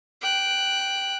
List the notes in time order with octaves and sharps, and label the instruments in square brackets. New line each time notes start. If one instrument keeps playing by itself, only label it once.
[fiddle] G5 F#6